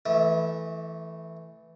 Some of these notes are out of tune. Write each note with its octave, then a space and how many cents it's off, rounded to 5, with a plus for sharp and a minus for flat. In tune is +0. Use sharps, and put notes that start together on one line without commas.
E3 +0 A3 +0 E5 -45